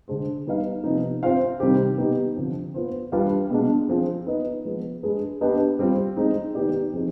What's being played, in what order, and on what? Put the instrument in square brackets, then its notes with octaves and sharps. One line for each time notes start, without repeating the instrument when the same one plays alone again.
[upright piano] D3 G#3 D4 G#4 C5
G3 B3 D#4 B4 F5
C3 F3 B3 D#4
C4 F4 C5 F5
C3 D#3 G3 C4 G4
B2 B3 D#4 G4
D3 F3 C4
B3 F4 C5
G3 D4 F4 B4 F5
B2 G#3 D4
F3 C4 F4 G#4
B3 D#4 B4 D#5
F3 G#3 B3
G#3 D4 G#4 B4
B3 D4 G4 B4 D#5
G3 C4 F4
G#3 C4 D#4
D#3 B3 D#4 G4 D5
F3 C4 D#4 G#4